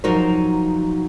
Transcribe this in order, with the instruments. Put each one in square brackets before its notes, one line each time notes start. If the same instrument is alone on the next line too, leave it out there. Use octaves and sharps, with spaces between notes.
[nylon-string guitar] F3 F#3 D#4 F#4 A#4 C5